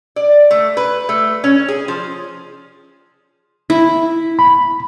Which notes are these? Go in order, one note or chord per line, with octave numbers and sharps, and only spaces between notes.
D5
A3
B4
A3
C#4
G#4
F3
E4
B5